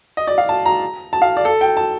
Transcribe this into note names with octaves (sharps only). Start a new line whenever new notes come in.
D#5
D5
F5
A5
A#5
A5
F5
D5
A4
G5
A5